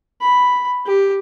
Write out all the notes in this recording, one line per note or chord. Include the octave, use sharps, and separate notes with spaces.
B5
G4